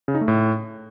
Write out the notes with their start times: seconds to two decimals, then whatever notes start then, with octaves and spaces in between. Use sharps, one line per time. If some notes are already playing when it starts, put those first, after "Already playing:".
0.08 C#3
0.15 D#4
0.21 A3
0.28 A2